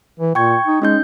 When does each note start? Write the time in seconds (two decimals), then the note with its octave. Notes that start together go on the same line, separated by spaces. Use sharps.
0.20 E3
0.35 A#2 G5 C#6 G#6
0.67 D#4
0.82 G#3 C#4 D#4 G6